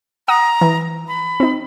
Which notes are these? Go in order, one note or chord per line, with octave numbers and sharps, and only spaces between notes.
F#5 A#5 D#6
E3
B5
C4 D#4